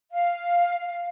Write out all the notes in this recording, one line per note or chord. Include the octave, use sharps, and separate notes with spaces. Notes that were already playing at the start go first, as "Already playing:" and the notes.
F5